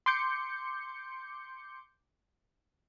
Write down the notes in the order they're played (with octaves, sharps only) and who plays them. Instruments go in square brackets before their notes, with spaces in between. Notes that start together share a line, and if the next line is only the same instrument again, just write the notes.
[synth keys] C6 D6 G6 C#7